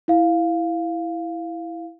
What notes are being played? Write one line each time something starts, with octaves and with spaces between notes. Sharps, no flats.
E4 F5